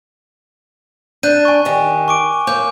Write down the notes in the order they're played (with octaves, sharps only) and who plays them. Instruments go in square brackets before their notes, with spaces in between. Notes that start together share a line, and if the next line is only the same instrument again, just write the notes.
[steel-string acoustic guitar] D4 [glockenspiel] F#6 G6 D#7
[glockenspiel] G#5 C#6
[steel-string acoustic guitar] D#3 G4
[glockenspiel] C#6 D6 D7
[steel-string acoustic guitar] A#3 C#5 [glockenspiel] D6 G6